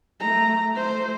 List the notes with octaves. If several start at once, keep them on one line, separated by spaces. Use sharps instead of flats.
A3 A#5
A3 C5